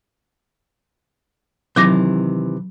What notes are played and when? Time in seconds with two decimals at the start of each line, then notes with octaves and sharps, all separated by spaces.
1.76 C3 D#3 E3 F#3 D6 A#6